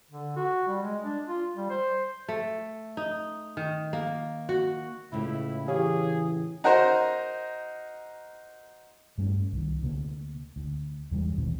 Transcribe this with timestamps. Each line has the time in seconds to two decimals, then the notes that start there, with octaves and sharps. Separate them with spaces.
0.11 D3
0.36 F#4
0.67 G3
0.82 G#3
1.03 D4
1.27 F4
1.56 G3
1.70 C5
2.28 A3
2.97 D#4
3.57 D#3
3.93 A#3
4.49 F#4
5.12 C#2 A2 C#3 E4
5.68 E3 G4 G#4 C#5 F5
6.64 D#4 F#4 A#4 C5
9.18 G2 G3 A3 C#4
9.52 C2 D#3
9.83 D2 C3 A#3
10.56 D2
11.11 E2 C3 G3 G#3
11.36 A1 D#2 B2 C4